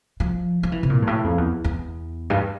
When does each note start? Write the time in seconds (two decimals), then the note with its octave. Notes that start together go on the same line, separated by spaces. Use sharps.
0.20 F3
0.63 F3
0.72 E3
0.83 C3
0.90 A#2
1.02 G2
1.07 A2
1.24 F2
1.38 E2
1.64 E2
2.30 G2